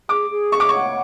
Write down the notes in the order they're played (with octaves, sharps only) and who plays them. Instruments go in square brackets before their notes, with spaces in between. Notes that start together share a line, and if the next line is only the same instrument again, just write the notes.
[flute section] G#4 [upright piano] D6
[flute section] G#4
[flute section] C#5 [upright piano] C#6
[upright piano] D6
C#6
[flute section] F#5